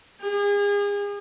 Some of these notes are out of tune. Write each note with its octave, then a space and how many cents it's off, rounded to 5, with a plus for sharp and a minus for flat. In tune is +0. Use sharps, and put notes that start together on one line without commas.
G#4 -35